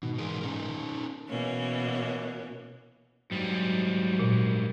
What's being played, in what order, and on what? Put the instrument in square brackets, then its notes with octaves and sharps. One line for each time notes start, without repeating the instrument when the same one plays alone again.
[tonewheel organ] G#2 D#3 [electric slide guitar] B2
[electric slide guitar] E3 G#4 A#4
C#4 D#4 A#4
[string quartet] B2 E3 A#3 C#4
[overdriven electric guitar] G#2 G3 [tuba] F#3
[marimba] A#2